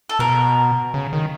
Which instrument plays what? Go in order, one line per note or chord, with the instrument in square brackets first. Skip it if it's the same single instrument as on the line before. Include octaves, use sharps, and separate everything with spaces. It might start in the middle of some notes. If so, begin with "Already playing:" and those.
[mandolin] A4
[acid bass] B2 [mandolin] A#4
[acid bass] C#3
D#3